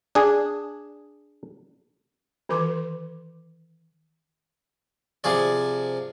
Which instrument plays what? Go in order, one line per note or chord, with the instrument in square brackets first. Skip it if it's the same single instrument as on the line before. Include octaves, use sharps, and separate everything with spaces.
[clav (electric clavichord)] D4 G#4
[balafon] D#3 E3 B4 C6 D6
[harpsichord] C3 F3 G#4 D5